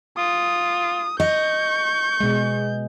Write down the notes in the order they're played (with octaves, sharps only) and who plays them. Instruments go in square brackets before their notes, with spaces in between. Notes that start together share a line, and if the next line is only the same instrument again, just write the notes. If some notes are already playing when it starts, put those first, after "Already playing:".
[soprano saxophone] F4 [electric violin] D#6
[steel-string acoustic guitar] D#5 [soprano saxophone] C#6 [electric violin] G6
[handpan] B2 G#3